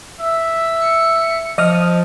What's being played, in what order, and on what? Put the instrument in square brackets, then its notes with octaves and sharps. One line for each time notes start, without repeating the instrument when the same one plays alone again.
[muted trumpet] E5
[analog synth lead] C#7
[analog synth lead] F3 [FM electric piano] D#5 D#6 F6